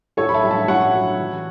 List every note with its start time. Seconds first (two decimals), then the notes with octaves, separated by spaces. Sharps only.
0.17 A2 A4 C#5
0.29 B5
0.34 E5 A5
0.43 A2
0.51 E5 A5
0.68 A2 C#5 F#5
0.94 F#3
1.19 E3